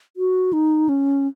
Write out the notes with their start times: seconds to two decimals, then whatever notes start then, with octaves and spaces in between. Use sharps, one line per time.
0.17 F#4
0.53 D#4
0.89 C#4